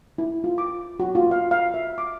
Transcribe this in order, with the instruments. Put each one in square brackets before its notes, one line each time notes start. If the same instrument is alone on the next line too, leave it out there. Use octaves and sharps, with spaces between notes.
[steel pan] E4
F4
D6
F#4
F4
F5
F5
E5
D6